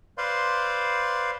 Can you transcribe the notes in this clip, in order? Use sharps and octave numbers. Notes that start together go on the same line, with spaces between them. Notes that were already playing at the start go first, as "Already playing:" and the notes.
B4 C5 D5 F5 C6